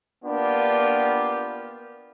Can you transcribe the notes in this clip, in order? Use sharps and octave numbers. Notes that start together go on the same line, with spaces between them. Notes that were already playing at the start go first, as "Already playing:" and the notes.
A#3 B3 D4 F4 G4